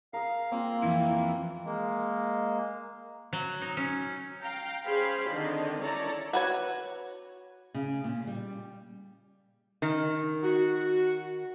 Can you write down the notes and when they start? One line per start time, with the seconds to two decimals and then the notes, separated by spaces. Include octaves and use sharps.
0.13 G#4 A#4 F5
0.52 A#3 C4 F4
0.82 F2 E3 E4
1.65 G#3 A#3
3.33 F#3
3.62 D#4
3.77 C#4
4.42 F5 G5 A#5
4.85 C#4 G#4 C5 F5 G5 B5
5.29 D3 D#3 C4 D#5
5.81 C#4 E4 A4 C#5 D5 A#5
6.33 F#4 B4 C#5
7.74 C#3
8.04 A#2
8.27 G3
9.82 D#3
10.43 F#4